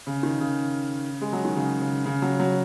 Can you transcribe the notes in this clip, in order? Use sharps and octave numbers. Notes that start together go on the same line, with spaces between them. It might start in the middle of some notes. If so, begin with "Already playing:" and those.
C#3
D#3
C#3
G#3
F#3
D#3
C#3
C#3
C#3
F#3
F#3